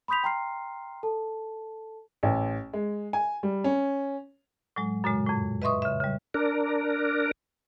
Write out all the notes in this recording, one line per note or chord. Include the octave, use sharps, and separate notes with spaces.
B5 C6 D#6 G6 B6 F7
G5 A#5 C6 F6 C7
A4 A5
A1
G#3
G#5
G3
C#4
A2 F#3 G#3
F#2 A#2 C#3 G#3
F2 A2
B4 D#5 E5 C6 C#6 D#6
C#3 E5
C#3 G3
D4 A#4